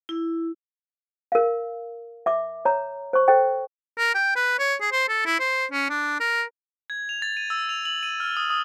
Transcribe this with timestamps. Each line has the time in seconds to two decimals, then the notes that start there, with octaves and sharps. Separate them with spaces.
0.09 E4
1.32 A#4 F5
2.26 E5 D6
2.65 C#5 A#5
3.13 C5 C#6
3.28 A4 C5 D#5 G5
3.98 A#4
4.15 G5
4.36 B4
4.59 C#5
4.81 G#4
4.92 C5
5.08 A4
5.26 E4
5.40 C5
5.72 C#4
5.90 D4
6.20 A#4
6.90 G#6
7.09 F7
7.22 A6
7.37 D#7
7.50 E6
7.69 F7
7.85 F#7
8.03 D#7
8.20 F6
8.37 D#6
8.50 D#6